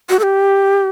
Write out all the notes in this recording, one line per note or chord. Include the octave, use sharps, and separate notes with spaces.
F#4
A4
G4